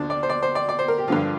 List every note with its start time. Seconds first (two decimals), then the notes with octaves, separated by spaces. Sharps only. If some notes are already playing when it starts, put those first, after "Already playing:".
Already playing: D2 F3 D4 F4
0.10 D5
0.23 C5
0.29 D5
0.42 C5
0.55 D5
0.69 D5
0.79 C5
0.88 A#4
0.98 G4
1.08 G2 D3 F3 F4